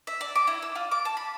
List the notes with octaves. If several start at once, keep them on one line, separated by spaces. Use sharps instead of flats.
E5
D5
D6
E4
E6
F4
D6
A5
B5